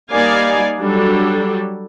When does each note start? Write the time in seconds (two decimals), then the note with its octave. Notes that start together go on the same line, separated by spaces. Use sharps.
0.11 G3 A#3 D#4 D5 F5 G#5
0.79 F#3 G3 D4 A4